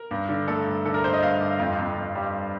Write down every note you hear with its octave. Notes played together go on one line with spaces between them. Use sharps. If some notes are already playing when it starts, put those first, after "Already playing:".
Already playing: A#4
G2
D3
A3 A4
G2
D3 A4
A#4
G2 C5
D#5
G2 F5
G2
F2
F2
F2
G3